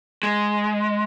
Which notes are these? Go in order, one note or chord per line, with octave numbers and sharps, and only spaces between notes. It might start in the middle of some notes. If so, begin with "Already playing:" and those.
G#3